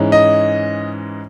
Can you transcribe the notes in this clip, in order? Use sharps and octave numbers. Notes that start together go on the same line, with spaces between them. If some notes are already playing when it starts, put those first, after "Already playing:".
Already playing: G#2 E3 G#3 C#4
D#5